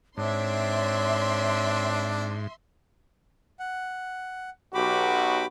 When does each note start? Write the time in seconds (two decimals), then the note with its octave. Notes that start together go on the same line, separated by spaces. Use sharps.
0.17 G#2 C4 D4 C#5 E5 C6
3.59 F#5
4.74 B1 F#4 G4 B5 D6